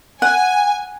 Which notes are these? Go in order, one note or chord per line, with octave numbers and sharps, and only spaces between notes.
F#5 G#5